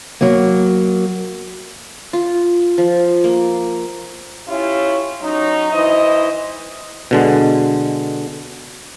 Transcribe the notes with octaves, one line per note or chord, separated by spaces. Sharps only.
F#3 A#3
F4
F3
A#3
C#4 E4 F4 G4 C#5
F#3 C#4 D#4
E3 E4 C5 D#5
B2 D3 G#3